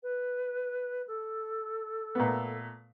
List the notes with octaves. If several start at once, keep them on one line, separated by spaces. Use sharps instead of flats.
B4
A4
A#2 A3 B3